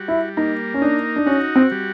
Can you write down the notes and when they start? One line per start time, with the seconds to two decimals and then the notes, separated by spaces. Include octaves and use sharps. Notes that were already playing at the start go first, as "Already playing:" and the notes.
Already playing: G3 F#4
0.08 E4
0.37 A#3 D#4
0.74 C#4
0.82 D4 D#4
1.16 D4
1.26 C#4 F#4
1.56 C4
1.71 G3